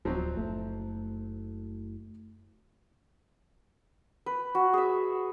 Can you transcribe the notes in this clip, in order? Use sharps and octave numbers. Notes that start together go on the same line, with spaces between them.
D1 F3 F#3 C4
F#1 A3
B4
F#4
G#4 E5